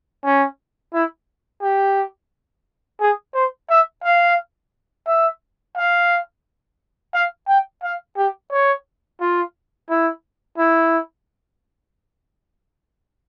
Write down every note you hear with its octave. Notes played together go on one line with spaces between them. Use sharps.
C#4
E4
G4
G#4
C5
E5
F5
E5
F5
F5
G5
F5
G4
C#5
F4
E4
E4